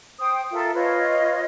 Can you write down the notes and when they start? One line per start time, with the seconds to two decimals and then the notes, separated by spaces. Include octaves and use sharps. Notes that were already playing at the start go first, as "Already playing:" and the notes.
0.20 C5 G5 D#6
0.53 F4 A4 A#4 E5
0.75 F4 B4 C#5 D#5